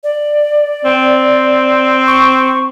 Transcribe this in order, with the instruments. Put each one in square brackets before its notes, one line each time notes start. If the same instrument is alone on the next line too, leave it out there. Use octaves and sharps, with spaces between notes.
[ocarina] D5
[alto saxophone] C4
[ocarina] C#6